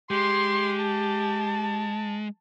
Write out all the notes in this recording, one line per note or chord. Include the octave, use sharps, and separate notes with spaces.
G#3 G4 C6
A5